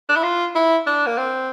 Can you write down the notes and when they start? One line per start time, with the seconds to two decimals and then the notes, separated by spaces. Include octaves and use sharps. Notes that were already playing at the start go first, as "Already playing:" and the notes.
0.09 D4
0.16 E4
0.23 F4
0.55 E4
0.87 D4
1.07 A#3
1.18 C4